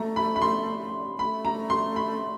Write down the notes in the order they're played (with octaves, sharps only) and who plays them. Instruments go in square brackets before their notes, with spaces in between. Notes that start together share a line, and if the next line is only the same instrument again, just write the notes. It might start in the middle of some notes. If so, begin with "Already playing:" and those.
Already playing: [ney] A3 [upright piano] A#5
[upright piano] B5
B5
C6
[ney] A3 [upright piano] B5
[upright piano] A#5
C6
B5